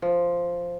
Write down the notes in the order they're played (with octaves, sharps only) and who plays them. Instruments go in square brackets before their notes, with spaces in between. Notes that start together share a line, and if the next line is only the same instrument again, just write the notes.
[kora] F3